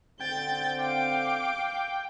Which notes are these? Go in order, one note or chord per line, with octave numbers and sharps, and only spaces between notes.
D3 C4 G5 G6 A6
F5 D6